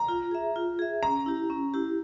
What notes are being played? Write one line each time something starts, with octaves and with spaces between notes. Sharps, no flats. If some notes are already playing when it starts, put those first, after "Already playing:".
Already playing: A#5
F4
G#4 E5
F4
G#4 E5
C#4 A#5
E4 G4
C#4
E4 G4